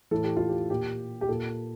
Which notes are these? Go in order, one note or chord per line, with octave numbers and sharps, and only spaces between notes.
A2 E3 A4
G4
F4
G4
A#2 G4
G4
A#2 A4